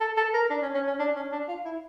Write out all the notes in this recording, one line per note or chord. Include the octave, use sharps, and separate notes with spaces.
A4
A4
A#4
D4
C#4
C#4
C#4
D4
C#4
D4
F4
E4